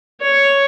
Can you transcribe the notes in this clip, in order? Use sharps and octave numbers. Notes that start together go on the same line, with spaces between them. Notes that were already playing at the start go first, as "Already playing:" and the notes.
C#5